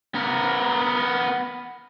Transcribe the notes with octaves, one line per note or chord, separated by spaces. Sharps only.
B3 A#4